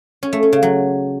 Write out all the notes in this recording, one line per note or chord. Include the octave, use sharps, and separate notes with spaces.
C#4
A3
C#4
C#3
F#3